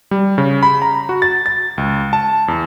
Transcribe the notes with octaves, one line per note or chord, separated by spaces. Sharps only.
G3
C#3
B5
A#5
F#4
A6
A6
C#2
A5
E2